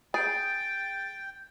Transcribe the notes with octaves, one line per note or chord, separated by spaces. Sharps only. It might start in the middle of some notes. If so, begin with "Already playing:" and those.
G#4 G5 A6 D7